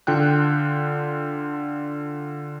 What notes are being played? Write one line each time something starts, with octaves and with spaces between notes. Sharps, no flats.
D3 F4 G5 F#6